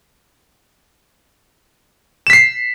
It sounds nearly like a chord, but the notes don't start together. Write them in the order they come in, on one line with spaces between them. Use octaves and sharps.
E7 B6 C7